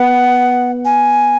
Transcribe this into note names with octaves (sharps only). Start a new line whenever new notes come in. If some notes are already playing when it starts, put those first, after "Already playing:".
Already playing: B3 F#5
G#5